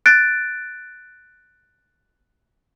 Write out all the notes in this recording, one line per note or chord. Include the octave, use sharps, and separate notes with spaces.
F#6 A6 D7